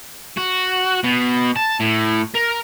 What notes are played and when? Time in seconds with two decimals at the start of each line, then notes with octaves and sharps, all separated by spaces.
0.37 F#4
1.04 B2
1.56 A5
1.80 A2
2.35 A#4